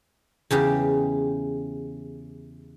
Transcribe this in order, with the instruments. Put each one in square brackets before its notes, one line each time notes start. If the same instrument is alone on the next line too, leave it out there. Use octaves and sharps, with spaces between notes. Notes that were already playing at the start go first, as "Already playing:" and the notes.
[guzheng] E2 C#3 G4 G5